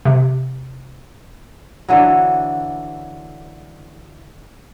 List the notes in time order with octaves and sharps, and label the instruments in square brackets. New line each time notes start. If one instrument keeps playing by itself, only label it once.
[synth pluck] C3
[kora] D3 E3 F#3